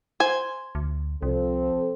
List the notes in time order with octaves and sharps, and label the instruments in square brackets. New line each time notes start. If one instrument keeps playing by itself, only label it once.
[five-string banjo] C5 G#5
[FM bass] D2
[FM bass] C2 [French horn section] F3 C4 A4